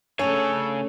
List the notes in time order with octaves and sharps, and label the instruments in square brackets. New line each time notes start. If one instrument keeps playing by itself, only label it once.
[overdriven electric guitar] C#3 G#5 [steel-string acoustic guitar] A3 C#4 D4 [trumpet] A4 [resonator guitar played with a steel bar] C#5